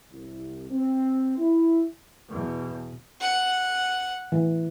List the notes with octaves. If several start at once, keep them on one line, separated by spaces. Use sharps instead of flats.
C2
C4
E4
E2 B2
F#5
E3